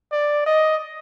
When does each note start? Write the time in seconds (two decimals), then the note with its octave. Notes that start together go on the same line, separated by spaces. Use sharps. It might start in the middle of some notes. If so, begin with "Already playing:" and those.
0.12 D5
0.46 D#5